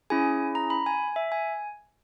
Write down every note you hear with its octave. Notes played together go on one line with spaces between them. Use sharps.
C#4 E4 G#4 G#5
A#5
B5
G#5
E5
G#5